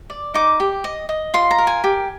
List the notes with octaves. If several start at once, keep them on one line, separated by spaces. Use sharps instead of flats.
D5
D#4 D6
G4
D#5
D#5
F4 C6
A#5
A#4
G#5
G4